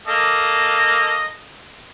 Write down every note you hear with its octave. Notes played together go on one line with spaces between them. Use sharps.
A#3 A4 D#5